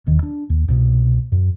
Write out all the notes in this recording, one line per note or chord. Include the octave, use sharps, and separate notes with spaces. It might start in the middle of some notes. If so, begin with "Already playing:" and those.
E1 D#2 D#3
D4
D#2
C2 B2
F#2